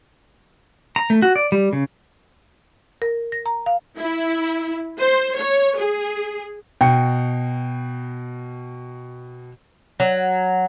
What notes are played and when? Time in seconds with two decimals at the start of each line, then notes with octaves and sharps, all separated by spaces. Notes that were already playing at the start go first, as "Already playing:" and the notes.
0.96 A#5
1.10 A3
1.22 F#4
1.36 D5
1.52 G3
1.73 C#3
3.02 A#4
3.32 A#6
3.46 A#5
3.66 F5
3.98 E4
4.99 C5
5.36 C#5
5.77 G#4
6.81 B2 G5 C#7
10.00 F#3